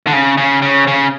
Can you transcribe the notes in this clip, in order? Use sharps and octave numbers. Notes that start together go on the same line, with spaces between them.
D3
C#3
C#3
C#3
C#3